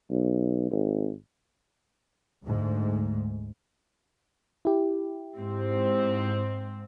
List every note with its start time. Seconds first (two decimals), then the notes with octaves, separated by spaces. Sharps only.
0.11 B1
0.71 G#1
2.43 D2 G#2
4.65 E4 G4
5.39 G#2 C4